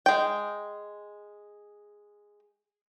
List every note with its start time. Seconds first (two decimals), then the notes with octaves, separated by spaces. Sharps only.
0.06 G#3 G5